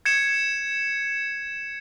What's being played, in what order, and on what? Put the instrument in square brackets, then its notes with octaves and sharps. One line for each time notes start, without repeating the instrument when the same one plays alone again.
[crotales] G#6 C#7 E7